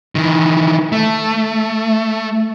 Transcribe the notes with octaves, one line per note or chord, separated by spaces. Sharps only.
D#3 E3
A3